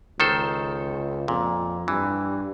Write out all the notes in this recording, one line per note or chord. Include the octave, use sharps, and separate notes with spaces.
C#2 D#3 A4 C5
F2 A#2
G2 E3